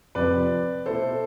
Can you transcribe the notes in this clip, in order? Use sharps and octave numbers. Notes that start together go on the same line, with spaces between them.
F2 C3 F3 B4 D5
B2 A3 E4 A4 C5